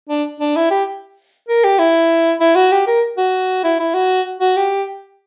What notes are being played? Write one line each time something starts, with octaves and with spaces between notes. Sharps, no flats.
D4
D4
E4
G4
A#4
G4
E4
E4
F#4
G4
A#4
F#4
E4
E4
F#4
F#4
G4